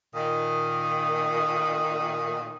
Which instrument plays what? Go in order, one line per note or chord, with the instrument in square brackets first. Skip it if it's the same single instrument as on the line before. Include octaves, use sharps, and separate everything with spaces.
[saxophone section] A#2 D#3 [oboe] D#6